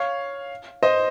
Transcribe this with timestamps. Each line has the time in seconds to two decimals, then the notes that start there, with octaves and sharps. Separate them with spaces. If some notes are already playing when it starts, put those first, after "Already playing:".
Already playing: C#5 F5
0.83 C5 D#5